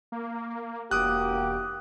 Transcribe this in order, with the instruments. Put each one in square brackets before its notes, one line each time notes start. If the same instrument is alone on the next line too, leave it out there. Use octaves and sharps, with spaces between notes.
[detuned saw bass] A#3
[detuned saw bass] E1 [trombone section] A#3 F#4 G4 [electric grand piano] D6 D#6 F#6